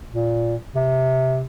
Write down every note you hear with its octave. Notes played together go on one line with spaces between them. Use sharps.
A#2
C3